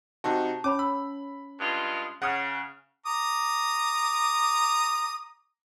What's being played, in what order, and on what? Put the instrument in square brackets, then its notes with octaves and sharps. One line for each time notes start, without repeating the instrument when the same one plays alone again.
[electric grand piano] C3 D#4 F#4 [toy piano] A5 C#6 D6
[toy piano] C#4 C#5 B5 [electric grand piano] D6
[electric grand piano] B5 [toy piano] E6
[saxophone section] G2 G#3 F4
[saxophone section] C#3 [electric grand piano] F#5 D#6 F6
[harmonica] A#5 D6 D#6